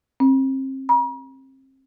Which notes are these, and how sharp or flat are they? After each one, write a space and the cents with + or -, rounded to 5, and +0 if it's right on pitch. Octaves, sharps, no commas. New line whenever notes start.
C4 +30
A#5 +45